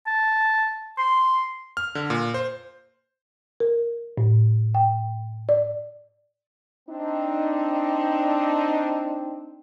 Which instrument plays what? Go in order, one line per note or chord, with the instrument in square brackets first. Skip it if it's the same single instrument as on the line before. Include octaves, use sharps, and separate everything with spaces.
[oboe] A5
C6
[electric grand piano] F6
D3
A#2
C5
[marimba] A#4
A2
G5
D5
[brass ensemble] C4 D4 D#4